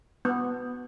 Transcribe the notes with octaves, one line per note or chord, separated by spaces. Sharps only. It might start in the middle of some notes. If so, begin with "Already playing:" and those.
B3